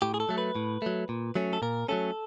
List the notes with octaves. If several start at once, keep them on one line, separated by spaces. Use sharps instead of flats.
A2 G4
G#4
A4
F#3 A3
B4
A2
F#3 A3
A#2
F#3 A3 C#4
A4
A#2 A#4
F#3 A3 C#4 A4